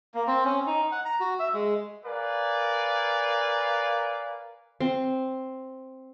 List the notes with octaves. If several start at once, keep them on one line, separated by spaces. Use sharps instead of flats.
A#3
C4
C#4
D#4
F#5
A#5
F#4
E5
G#3
A#4 B4 D5 F5 G#5
C4